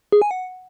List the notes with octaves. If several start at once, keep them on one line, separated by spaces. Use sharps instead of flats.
G#4
G#5
F#5